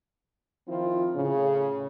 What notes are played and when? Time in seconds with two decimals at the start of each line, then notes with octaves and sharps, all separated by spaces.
0.67 D#3 F3 C4 E4 F4
1.15 A2 C#3